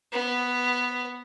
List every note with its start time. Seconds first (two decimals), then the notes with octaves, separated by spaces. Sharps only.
0.12 B3